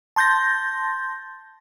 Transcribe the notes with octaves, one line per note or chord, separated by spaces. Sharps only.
A5 C6 G6 A6 A#6